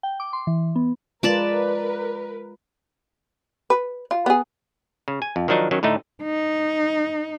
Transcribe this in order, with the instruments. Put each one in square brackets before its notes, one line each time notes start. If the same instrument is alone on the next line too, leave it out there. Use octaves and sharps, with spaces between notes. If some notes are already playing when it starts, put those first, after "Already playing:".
[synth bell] G5
D6
C6
E3
B3
[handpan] G#3 F4 [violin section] A#4 B4 [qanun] D5 A5 D6
[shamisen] B4
F4
B3 G#4
[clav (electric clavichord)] C#3
G#5
F2
D#3 F3 F#3 D4 D#4
D#3 F#3 C#4
A2 D3 A3 D#4
[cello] D#4